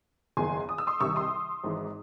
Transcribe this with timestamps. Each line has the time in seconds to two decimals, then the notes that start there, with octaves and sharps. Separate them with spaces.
0.37 F#1 E2 D#3 G#5 C6
0.69 D#6
0.78 E6
0.87 C6 D#6
1.00 C2 C3 D#3 C#6 E6
1.16 C6 D#6
1.64 G#1 G#2 E3